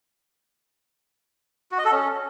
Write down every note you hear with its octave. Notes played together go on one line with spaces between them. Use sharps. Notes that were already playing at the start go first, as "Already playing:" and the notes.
F#4
D#5
A4
C#4